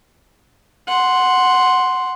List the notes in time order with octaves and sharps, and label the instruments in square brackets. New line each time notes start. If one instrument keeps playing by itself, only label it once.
[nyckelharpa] F#5 C6